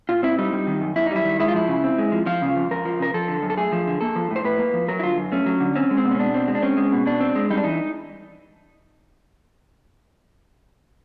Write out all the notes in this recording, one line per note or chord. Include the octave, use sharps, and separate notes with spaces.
A#2 F4
C4 E4
G3 D#4
G3
D#3
F#2
F#2 E4
D#4
G3 E4
D#3
G#3 E4
F4
F3 E4
C#3
C4
G#3
F3
F3 F4
C#3
F2
F2 A#4
F3
C#3 A#4
F3 A4
D3
F#2
A4
A3 G#4
F3
D3
A#3 A4
F3
A2
C5
A2 B4
A#3
F3
F#3 A#4
E4
D3 F4
F#2
A3 C#4
F#3
D3
C4 C#4
G#3
C4
B2
C#4
B2 D4
C4
G#3
D4
C4 C#4
G#3
B2
B2 D4
C4
G#3
G3 D#4
D4
E3 D#4